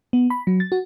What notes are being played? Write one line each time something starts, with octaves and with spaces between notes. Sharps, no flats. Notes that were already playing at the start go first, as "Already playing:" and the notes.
B3
B5
F#3
A6
F#4